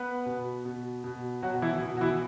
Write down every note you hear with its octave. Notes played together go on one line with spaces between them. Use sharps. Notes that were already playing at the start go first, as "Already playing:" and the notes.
Already playing: B3 B4
B2
B2
B2
B2 F#3 F#4
F#4
E3 E4
B2
F#4
E3 E4